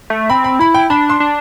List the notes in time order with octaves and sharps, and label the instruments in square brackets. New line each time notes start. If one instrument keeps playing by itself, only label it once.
[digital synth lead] A3
[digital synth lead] C4 [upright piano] B5
[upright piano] B5
[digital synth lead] E4 [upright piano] B5
[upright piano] G5
[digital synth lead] D4 [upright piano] B5
[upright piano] C6
[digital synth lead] D4